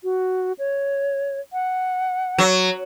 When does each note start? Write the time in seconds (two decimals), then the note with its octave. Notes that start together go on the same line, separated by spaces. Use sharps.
0.04 F#4
0.59 C#5
1.53 F#5
2.38 F#3